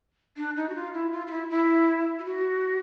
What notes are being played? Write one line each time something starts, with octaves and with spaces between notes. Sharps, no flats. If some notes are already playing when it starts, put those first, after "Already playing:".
D4
D#4
F#4
F4
E4
F4
F4
E4
E4
F4
F#4